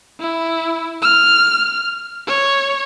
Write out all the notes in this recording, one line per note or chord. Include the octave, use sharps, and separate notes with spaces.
E4
F6
C#5